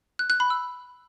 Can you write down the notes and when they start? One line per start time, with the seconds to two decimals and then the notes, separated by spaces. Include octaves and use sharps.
0.19 F#6
0.30 F#6
0.40 B5
0.50 E6